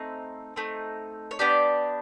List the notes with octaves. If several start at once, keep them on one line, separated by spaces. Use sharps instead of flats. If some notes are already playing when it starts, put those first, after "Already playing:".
Already playing: A3 C4 D#4
A3 C4 D#4
C#5
B3 D4 G4 D5